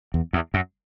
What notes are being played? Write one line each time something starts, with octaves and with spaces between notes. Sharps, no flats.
E2
E2
F#2